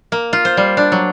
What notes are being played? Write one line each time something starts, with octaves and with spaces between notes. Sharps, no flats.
A#3
F4
C5
G3
D4
F#3